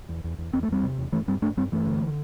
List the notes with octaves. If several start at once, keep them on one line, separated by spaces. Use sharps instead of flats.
E2
E2
E2
E2 C4
A3
E2 G3 C4
C3
E2
G2 E3 A3
G2 G3 C4
G2 A3 D4
G2 G3 C4
G2 E3 A3
D3